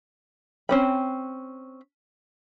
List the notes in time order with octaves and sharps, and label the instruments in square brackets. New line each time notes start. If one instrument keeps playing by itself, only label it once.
[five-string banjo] C4 C#4 B5